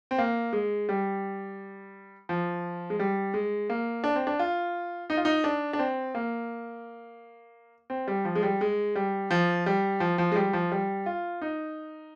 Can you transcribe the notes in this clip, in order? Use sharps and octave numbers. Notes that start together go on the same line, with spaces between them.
C4
A#3
G#3
G3
F3
G#3
G3
G#3
A#3
D4
C4
D4
F4
D#4
F4
D#4
D4
D4
C4
A#3
C4
G3
F3
G#3
G3
G#3
G3
F3
G3
F3
F3
G#3
G3
F3
G3
F4
D#4